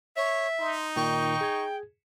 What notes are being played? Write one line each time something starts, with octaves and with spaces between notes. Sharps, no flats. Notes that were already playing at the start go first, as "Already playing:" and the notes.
C#5 E5
D#4 C6
A#2 D#3 G5 C#6
G#4 G#6